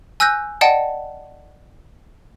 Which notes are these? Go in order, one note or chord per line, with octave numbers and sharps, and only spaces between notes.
G#5 E6 F#6 G6 A#6
D5 D#5 F#5 G5 A5